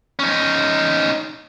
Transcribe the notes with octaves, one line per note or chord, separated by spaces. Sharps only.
C#4 D#4